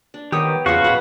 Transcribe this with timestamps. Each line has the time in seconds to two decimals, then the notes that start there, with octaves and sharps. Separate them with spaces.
0.14 D4
0.32 D#3 B3 G4 C#5 D#6
0.66 E2 C#3 F3 B3 F#4 F5 C#6
0.84 D1 B2 F#5 B5